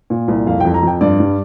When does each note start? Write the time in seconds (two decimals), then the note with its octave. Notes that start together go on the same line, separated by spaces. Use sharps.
0.10 A#2
0.28 C2
0.46 F2 F5
0.60 F2 G5
0.74 A#5
0.83 F2 G5
1.01 G2 D5
1.20 G3